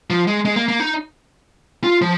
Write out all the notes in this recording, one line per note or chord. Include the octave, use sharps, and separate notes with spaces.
F3
G#3
G#3
A#3
A#3
D#4
F4
F3